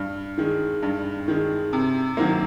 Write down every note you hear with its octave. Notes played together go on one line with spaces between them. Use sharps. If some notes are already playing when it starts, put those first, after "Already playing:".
Already playing: G2
D#3 G#3
G2
D#3 G#3
C3
D#3 F#3 A#3